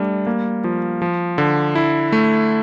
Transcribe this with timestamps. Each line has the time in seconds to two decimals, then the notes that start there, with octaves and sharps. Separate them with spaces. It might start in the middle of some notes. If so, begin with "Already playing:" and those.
Already playing: G3 A3 D4
0.27 A#3
0.64 F3
1.02 F3
1.38 D3
1.75 E4
2.12 A3